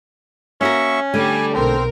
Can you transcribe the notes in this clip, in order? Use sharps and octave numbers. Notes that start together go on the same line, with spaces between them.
A#3 C#4 F#4 A#4 E5 C#6
D3 G3 A3 G#5
B1 C4 A#4 C5